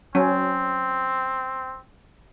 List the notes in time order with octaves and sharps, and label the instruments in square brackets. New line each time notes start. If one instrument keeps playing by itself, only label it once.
[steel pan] F#3 C#4 [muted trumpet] C4